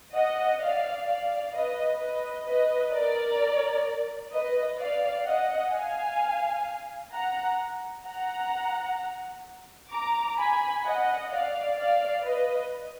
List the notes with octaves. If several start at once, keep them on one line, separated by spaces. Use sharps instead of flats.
D#5 F#5
D5 F5
D5 F5
B4 D#5
B4 D#5
B4 D#5
A#4 D5
B4 D#5
D5 F5
D#5 F#5
F5 G#5
F#5 A#5
F#5 A#5
A#5 D6
G#5 B5
D#5 F#5
D5 F5
D5 F5
B4 D#5